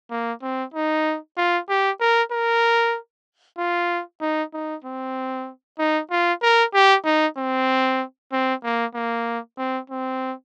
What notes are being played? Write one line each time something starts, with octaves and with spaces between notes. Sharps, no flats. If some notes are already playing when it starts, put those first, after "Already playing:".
A#3
C4
D#4
F4
G4
A#4
A#4
F4
D#4
D#4
C4
D#4
F4
A#4
G4
D#4
C4
C4
A#3
A#3
C4
C4